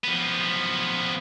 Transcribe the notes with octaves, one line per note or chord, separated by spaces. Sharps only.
F3 B3